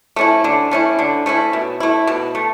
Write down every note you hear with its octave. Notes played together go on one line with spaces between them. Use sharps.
A3 C#4 E4
D3
A3 C#4 E4
D3
A3 C#4 E4
B2
A3 E4
B2
A3